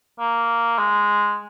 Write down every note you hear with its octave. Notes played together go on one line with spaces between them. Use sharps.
A#3
G#3